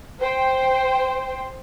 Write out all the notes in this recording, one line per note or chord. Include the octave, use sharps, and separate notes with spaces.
C5 G5